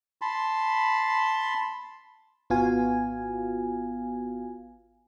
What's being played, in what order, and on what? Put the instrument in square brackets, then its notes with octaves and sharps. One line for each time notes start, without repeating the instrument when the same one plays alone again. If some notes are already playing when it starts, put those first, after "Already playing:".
[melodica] A5 B5 C6
[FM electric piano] G#1 B3 F4 F#4 F5 G#5